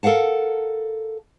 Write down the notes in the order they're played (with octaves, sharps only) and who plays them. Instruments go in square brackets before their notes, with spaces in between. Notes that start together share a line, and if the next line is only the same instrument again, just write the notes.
[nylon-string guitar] A4 A#4 F5 F#5 A5